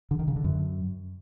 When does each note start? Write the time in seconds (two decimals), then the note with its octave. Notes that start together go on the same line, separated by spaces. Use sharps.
0.11 D3
0.19 D#3
0.28 C#3
0.36 D3
0.44 F#2